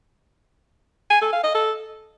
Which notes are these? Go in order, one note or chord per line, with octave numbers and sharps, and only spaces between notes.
G#5
A4
F5
D#5
A4